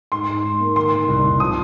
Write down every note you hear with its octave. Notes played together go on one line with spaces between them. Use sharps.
G#2 C6
G#2
G#2
A#3
D#3 C6
D#3
C2
C2
F3 D#6